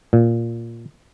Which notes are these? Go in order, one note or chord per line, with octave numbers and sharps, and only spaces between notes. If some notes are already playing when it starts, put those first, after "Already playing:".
A#2